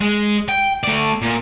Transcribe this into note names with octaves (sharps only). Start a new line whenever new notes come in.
G#3
G5
A3 D5
A#2